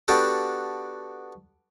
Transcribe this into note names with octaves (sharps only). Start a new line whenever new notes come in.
B3 D4 F#4 G4 A4